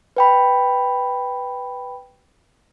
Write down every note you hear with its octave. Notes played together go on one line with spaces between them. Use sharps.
B4 G5 B5